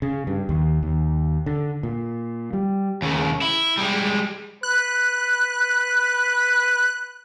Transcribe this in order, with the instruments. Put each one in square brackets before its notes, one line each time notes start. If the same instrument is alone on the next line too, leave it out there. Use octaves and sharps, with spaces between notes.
[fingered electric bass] C#3
G2
D#2
D#2
D3
A#2
G3
[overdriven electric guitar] D#2 C#3
E4
G3 G#3
[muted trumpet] B4 [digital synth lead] F#6